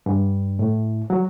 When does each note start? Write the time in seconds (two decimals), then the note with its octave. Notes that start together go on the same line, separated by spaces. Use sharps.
0.06 G2
0.59 A2
1.10 F#3